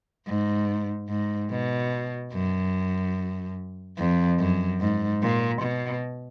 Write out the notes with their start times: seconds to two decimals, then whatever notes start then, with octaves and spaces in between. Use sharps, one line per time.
0.28 G#2
1.09 G#2
1.51 B2
2.33 F#2
3.98 F2
4.39 F#2
4.80 G#2
5.22 A#2
5.63 B2